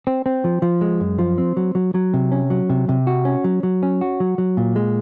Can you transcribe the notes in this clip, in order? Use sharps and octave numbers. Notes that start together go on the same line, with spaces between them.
C4
C4
F3
F3
G#3
F#2
F3
C4
F#3
F#3
F#3
C3
C#4
F#3
C3
C3
F#4
C#4
F#3
F#3
C#4
F#4
F#3
F#3
A#2
G#3